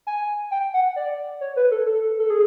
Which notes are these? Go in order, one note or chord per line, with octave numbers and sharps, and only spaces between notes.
G#5
G5
F#5
D5
C#5
B4
A4
A4
A4
G#4